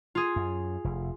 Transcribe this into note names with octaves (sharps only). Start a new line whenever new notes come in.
F4 G#4
F#2
F1